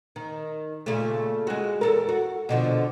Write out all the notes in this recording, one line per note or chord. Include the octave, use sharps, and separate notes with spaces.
D#3
A#2 C#3 A3
G#3 F#4
E2 A4 A#4
F#4
B2 D3 F3